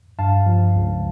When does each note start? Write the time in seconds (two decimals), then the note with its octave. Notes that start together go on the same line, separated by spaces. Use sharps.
0.19 G2 F5 A5
0.46 F3
0.76 C#2